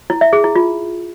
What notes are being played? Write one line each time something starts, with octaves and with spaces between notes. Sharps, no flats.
E4
E5
G#4
E4
F4